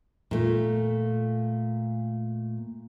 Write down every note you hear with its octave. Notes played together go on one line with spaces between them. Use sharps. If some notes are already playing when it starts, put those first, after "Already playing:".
A#2 A3